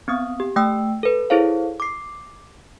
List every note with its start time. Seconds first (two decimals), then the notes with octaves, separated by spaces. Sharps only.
0.08 B3 C4 D#6
0.40 G4
0.56 A3 G5 E6
1.03 A4 B4
1.30 E4 G#4 A4 C5 C#5 F5
1.80 D6 C7